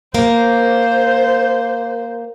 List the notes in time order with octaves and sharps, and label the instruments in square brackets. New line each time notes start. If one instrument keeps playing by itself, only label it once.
[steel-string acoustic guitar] A#3 [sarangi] C5